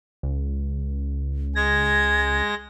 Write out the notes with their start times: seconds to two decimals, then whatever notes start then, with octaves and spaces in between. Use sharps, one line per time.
0.23 C#2
1.55 G#3 G#6 A#6